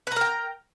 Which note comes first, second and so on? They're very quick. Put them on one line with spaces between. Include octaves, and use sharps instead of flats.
B4 A#5 A#4 G5